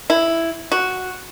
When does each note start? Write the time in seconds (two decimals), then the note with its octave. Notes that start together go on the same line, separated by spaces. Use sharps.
0.10 E4
0.72 F#4